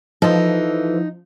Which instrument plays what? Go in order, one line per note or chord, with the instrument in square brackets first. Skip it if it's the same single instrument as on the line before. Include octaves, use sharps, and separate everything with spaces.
[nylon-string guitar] E3 A4 [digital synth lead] F3 [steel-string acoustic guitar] D#4